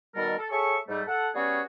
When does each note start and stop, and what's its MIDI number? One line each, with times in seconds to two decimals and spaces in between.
0.15 0.36 47
0.15 0.36 51
0.15 0.36 55
0.15 0.36 69
0.15 0.36 70
0.38 0.48 69
0.51 0.78 68
0.51 0.78 69
0.51 0.78 73
0.51 0.78 76
0.51 0.78 85
0.89 1.02 44
0.89 1.02 55
0.89 1.02 57
1.08 1.29 69
1.08 1.29 78
1.35 1.61 55
1.35 1.61 59
1.35 1.61 61
1.35 1.61 66
1.35 1.61 68
1.35 1.61 73